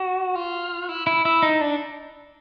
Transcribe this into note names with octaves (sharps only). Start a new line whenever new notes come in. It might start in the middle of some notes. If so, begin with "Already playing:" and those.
Already playing: F#4
F4
E4
E4
E4
D#4
D4